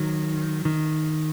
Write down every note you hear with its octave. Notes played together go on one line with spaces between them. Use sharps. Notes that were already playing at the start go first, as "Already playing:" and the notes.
Already playing: D#3 F#3
D#3